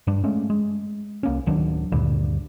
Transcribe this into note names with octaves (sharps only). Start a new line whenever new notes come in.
G2 G3 D4
G#3 A3 C#4
G#3
C2 A#3 C#4
D1 D#3 F#3 D4
D2 G2 A#2 D3